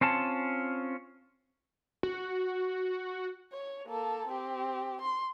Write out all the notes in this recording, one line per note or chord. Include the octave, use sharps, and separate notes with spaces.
C4 C#4 F4 A5
F#4
C#5
A#3 A4
C4 G4
C6